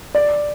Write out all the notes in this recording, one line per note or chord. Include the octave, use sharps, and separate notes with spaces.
D5